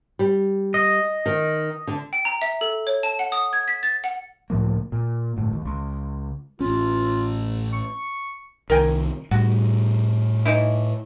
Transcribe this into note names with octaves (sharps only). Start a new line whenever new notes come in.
G3
D#5
D#3
D3
G5
A#5
E5
A4
C#5
A5
F#5
D#6
G#6
B6
A6
F#5
C#2 A2 F3 A#3
A#2
G1 A2
D#2
C#2
A1 C#4 F4
C#6
C2 D#3 A#4 G5 G#5
A2 G3 F#4
E3 D#4 E4